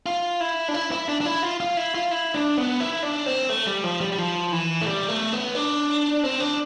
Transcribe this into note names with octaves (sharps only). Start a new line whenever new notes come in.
F4
E4
D4
E4
E4
D4
D4
E4
F4
F4
E4
F4
E4
D4
B3
E4
D4
C4
A3
G3
F3
G3
G3
F3
E3
A3
G3
A3
B3
D4
C4
D4